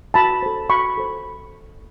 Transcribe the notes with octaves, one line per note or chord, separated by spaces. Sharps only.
F#4 A5 B5
A4 C5
F#4 B5 C#6
A4 C5